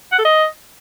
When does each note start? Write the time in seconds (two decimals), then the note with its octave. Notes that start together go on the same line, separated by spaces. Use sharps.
0.12 F#5
0.19 A4
0.25 D#5